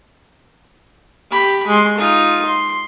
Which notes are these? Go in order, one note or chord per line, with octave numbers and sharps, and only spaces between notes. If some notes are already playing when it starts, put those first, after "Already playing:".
G4 B5
G#3 C6
D#4 F4
C6